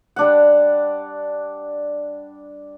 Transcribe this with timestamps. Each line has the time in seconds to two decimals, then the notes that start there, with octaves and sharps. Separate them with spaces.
0.16 G3 D4 F#5